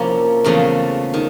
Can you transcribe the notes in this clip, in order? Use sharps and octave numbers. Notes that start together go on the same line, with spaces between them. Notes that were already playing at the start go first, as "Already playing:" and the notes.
Already playing: C3 F3 A#3 C#4 E4
E2 C#3 F3 A3
D#3